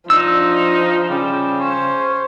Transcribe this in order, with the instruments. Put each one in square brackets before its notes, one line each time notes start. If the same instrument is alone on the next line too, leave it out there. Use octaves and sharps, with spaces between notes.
[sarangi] F3 [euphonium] D4 [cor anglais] D#4 [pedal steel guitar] E6
[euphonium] C#3 [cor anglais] G3
[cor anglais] C#4 [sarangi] C5